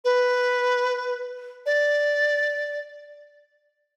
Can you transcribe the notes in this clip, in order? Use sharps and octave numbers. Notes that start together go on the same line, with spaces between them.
B4
D5